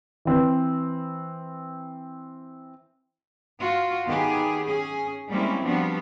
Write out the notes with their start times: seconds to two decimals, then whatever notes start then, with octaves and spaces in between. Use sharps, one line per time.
0.25 E3 C4 B4
3.59 F4 F#4
4.06 D#3 B3 D#4 G4 G#4
4.63 C#4 G#4
5.30 G3 G#3 A#3 C4 C#4 E4
5.64 F3 G3 B3 D4 F#4